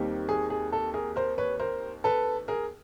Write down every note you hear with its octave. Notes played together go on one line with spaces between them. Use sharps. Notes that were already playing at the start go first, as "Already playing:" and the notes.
Already playing: D#2 D#3 G3 C4
G#4
G#4
A4
G#4 A#4
A#4 C5
B4 C#5
A#4 C5
A4 B4
G#4 A#4